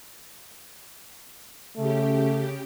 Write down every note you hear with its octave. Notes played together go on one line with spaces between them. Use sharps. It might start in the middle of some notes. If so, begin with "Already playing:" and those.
C#3 A3 G4